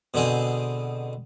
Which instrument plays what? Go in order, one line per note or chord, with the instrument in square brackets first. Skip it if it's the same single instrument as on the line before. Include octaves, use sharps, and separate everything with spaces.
[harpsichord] B2 D3 C4 G#4